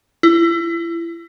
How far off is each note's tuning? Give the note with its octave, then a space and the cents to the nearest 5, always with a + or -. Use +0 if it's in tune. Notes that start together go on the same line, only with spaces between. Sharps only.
E4 +30